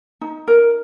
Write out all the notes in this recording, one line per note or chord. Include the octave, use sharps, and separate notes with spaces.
D#4
A#4